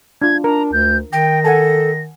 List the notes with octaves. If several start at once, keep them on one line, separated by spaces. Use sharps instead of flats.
D4 F4 G#6
D4 A#4 A#5
D2 G6
D#3 G5 A#6
A4 F#5 G#5 A5